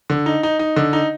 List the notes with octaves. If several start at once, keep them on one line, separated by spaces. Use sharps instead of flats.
D3
D#4
D#4
D#4
D3
D#4